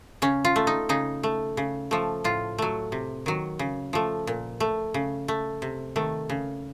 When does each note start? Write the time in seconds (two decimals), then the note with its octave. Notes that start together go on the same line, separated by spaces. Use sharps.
0.22 C#3 C#4
0.45 F4
0.56 A3
0.67 D#4
0.89 C#3 D#4
1.23 A3
1.57 C#3
1.91 F3 A3
2.24 A2 F4
2.58 F#3 A3
2.92 C3
3.26 D#3 F#3
3.59 C#3
3.93 F3 A3
4.27 A#2
4.60 A3
4.94 C#3
5.28 A3
5.62 C3
5.96 D#3 A3
6.30 C#3